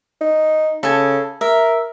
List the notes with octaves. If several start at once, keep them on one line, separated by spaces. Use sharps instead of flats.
D#4
C#3 A4 G#5
A#4 E5